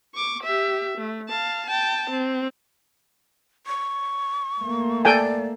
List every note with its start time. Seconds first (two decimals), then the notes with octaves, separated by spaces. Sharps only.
0.15 C#6 D6
0.43 G4 E5
0.98 A3
1.28 F5 A5
1.67 G5 A5
2.10 C4
3.67 C#6
4.62 A3 A#3
5.05 A4 D5 G5 G#5